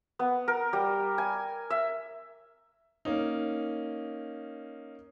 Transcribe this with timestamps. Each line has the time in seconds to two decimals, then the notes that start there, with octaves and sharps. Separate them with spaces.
0.19 B3
0.48 A#4
0.73 G3
1.18 G#5
1.70 E5
3.05 A#3 C#4 D#4